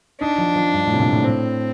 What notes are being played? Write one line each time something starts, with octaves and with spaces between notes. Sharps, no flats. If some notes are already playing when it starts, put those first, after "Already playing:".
D4 D#4
F3
F3
G2
A2
C3
A#2
A2
C4